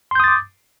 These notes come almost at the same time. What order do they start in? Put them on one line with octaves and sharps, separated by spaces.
C6 G6 D#6 A6 D6